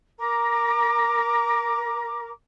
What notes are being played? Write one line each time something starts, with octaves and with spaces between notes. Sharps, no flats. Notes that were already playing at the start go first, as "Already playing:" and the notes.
A#4 A#5 D6